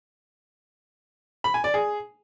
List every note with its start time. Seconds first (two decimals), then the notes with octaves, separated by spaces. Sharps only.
1.44 B5
1.54 G#5
1.64 D5
1.74 G#4